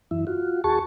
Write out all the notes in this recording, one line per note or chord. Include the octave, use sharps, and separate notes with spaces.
F#2 E3 E4
F4 F#4
D#2 F#4 G#4 A5 C#6